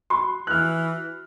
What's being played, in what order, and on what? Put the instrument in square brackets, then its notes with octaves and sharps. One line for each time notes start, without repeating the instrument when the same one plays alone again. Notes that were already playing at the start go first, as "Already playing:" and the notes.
[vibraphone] F#4 [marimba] B5 [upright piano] C6
[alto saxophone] E3 [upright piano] F6 F#6